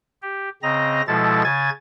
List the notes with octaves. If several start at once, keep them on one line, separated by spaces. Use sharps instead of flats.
G4
C#3 C4 D#5 A#5 A#6
B2 F3 G#3 E4 A4 A6
C#3 G#5 G#6 A6